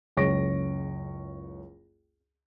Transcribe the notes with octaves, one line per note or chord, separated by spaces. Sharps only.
F#1 C#2 C#5 C#6 A#6 D7